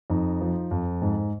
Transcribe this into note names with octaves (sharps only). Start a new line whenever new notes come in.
F2 D#4
F3
F2
G#2